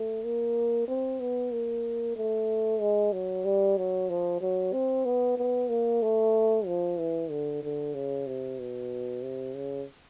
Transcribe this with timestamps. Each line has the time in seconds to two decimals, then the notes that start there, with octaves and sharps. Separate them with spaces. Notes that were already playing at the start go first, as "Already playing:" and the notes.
Already playing: A3
0.24 A#3
0.88 C4
1.20 B3
1.53 A#3
2.16 A3
2.81 G#3
3.13 F#3
3.45 G3
3.78 F#3
4.09 F3
4.41 F#3
4.73 C4
5.05 B3
5.38 B3
5.70 A#3
6.02 A3
6.66 F3
6.99 E3
7.30 D3
7.63 D3
7.95 C#3
8.27 C3
8.59 B2
9.23 C3
9.56 C#3